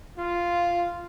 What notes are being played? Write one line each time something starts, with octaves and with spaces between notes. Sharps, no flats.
F4